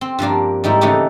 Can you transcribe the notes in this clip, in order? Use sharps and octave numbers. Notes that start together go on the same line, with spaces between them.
C4
G2 F3 A#3 D4
G#2 G3 D#4 E4
C#3 E3 A3 C#4 D#4 G4